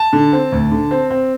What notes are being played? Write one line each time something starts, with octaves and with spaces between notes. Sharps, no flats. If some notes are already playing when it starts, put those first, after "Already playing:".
Already playing: A5
D3
C4
D2
D3
C4
C4